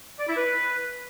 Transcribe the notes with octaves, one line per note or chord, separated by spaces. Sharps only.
D5
E4
B4